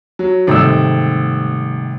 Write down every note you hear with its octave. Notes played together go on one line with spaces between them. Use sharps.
F#3
G#1 C3 G3 A3 C4 E6